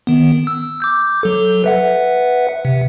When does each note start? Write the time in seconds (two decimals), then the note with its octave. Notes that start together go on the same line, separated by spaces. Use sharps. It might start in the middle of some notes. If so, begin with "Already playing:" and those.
0.07 D#3 B3
0.47 E6
0.82 D6 G6
1.23 F#3 A4
1.64 B4 E5 F#5
2.65 C3